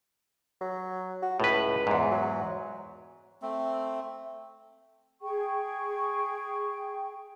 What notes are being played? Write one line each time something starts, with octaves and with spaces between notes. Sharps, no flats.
F#3
F#4
C#2 A2 B4
E2 G#2
F#3
A3 C4
G#4 G5 C#6